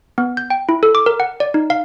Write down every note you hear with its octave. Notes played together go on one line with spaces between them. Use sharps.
B3
G6
G5
E4
A4
D6
A#4
F#5
D5
D#4
F5